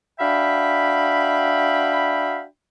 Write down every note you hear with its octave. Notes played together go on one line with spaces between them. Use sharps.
D4 F#4 E5 F5 G5 B5